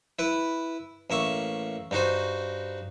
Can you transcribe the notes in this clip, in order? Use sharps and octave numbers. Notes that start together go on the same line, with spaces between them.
E4 B4
A1 A#3 E5 C#6
G2 D#4 F#4 C5